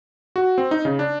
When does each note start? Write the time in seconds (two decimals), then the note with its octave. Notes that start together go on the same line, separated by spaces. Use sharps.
0.36 F#4
0.58 C4
0.71 D#4
0.85 C#3
0.99 D4